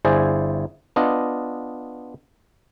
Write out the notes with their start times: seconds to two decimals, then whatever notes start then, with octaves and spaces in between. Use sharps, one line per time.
0.05 G1 E4 G#4 C5 D5 G#5
0.96 B3 D4 F4 D#5